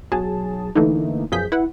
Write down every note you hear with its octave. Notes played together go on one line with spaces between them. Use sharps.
B1 F#3 G#4 A5
D3 E3 A3 A#3 D#4
F#2 B2 F3 G#4 G6 B6
E4 B4 F#5